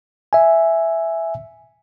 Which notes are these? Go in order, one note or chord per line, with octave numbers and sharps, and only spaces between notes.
E5 G#5